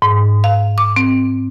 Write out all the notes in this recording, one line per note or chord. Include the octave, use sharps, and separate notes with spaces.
G#2
F5
D6
C4